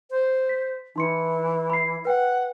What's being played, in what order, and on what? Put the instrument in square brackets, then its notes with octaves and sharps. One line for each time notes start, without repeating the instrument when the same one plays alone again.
[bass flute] C5
[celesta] B6
[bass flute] E3 [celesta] D#4 C6 C#7
[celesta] B5 C7
[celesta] B4 G5 [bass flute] F#5